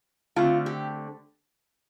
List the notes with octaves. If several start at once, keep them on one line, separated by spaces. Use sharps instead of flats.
D3 A3 C4 F4
G4